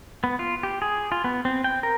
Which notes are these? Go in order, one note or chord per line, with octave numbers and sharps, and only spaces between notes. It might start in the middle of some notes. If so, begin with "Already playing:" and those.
B3
F4
G4
G#4
F4
B3
C4
G5
A#4